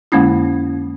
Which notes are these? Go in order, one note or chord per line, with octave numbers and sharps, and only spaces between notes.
F2 D3 G#3 A#3 C#4 E4